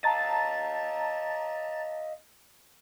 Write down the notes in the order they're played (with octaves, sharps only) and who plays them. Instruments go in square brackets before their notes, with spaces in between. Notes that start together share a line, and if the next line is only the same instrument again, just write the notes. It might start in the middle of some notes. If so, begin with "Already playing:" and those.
[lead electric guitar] D#5 F5 [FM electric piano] A5 A#5 A6